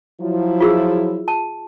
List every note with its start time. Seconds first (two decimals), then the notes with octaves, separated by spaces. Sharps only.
0.21 F3 F#3 E4
0.61 F4 G#4 E6
1.28 A5